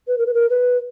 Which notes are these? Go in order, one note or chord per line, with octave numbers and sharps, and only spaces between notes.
B4
A#4
B4
A#4
B4